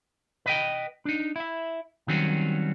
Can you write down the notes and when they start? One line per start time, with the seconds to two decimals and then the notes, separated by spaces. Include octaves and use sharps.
0.46 B4 D#5 G5
1.05 D4 D#4
1.36 E4 E5
2.08 D#3 F#3 G3 C4 C#4